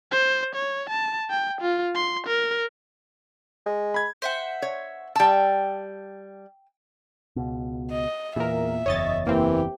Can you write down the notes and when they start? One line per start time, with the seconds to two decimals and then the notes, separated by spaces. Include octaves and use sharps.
0.12 C5
0.55 C#5
0.90 A5
1.30 G5
1.61 F4
1.95 C6
2.27 A#4
3.66 G#3
3.94 B5 G#6
4.22 C5 E5 F#5
4.62 C#5
5.16 G3 G5 A5 E6
7.36 C#2 B2
7.91 D#5
8.36 E2 A#2 A#4 E5
8.86 F#1 E2 C#5 D#5 A6
9.27 E3 A#3 C4 G4